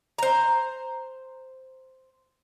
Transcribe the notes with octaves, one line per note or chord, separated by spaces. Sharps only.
C5 A#5